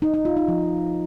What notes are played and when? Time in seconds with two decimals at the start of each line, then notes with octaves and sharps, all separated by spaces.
0.02 D#4
0.14 D#4
0.25 F4
0.37 D#4
0.48 F3